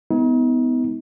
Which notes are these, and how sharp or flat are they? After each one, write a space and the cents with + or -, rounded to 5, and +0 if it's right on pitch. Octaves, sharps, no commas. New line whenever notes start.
G#3 +0 B3 +25 D#4 +40